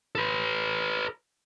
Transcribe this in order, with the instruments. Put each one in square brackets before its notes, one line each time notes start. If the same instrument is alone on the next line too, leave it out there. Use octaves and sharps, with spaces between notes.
[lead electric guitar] A4 B4